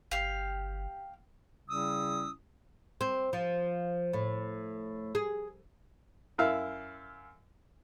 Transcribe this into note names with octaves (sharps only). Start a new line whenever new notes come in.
G1 G4 F5
C#3 G3 C#4 E4 D#6 E6
C4
F3
A2
G#4
F#2 E4 E5 F5